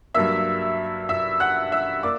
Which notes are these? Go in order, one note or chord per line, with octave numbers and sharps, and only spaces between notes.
G2 F#3 A#3 E5 E6
E5 E6
F#5 F#6
E5 E6
A#3 D5 D6